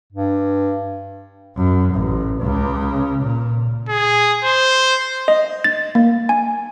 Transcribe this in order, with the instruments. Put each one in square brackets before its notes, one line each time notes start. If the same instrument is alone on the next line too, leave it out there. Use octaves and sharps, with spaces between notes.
[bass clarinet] G2
[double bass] F#2
A1
C#2 C#3
A#2
[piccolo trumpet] G#4
C5
[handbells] D#5
A6
A#3
G#5